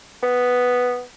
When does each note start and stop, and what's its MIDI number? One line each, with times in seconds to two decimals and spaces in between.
0.23 1.02 59